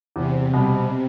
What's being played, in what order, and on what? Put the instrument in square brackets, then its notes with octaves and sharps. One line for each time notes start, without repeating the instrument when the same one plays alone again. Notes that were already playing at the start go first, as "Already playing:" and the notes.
[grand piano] E2 [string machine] C3
[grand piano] B2 G3